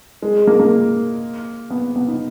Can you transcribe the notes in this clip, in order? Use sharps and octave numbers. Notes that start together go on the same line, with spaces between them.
G#3
A#3
A#3
B3
B3
D#4